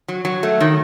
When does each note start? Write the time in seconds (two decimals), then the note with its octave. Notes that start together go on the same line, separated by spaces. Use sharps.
0.08 F#3
0.25 F#3
0.43 A3
0.60 D#3